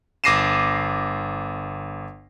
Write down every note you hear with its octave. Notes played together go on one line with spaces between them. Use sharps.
G1 D6 A#6 C7 D#7 E7